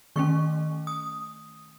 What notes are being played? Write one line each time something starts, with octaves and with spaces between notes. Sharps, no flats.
D#3 A3 C#4 C#6
D#6